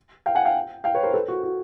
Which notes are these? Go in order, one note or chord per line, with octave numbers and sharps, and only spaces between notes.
F5 G5
F#5 G#5
F5 G5
F5 G5
B4 C#5
A#4 C5
A4 B4
F#4
F#4